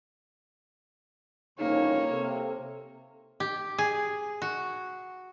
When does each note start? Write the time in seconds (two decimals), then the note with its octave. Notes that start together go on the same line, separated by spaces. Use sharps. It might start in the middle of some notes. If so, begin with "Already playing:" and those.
1.59 C2 F2 C#3 A#3 D#4 C#5
2.11 C3 A4
3.40 G4
3.78 G#4
4.42 F#4